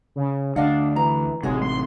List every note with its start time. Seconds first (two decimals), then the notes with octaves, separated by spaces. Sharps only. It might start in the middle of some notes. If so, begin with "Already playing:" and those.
0.16 C#3
0.56 D2 D4 D#5 F5 F#5
0.96 E3 A#5
1.43 A1 C3 G#3 D#4 F#4 C#5
1.62 C6